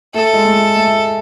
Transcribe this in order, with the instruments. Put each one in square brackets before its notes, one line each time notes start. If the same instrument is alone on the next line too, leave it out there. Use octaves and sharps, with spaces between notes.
[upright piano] A3 [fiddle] A4
[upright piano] G#3
A3
A3